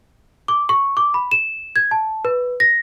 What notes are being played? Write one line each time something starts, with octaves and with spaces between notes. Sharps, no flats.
D6
C#6
D6
B5
E7
G#6
A5
B4
A#6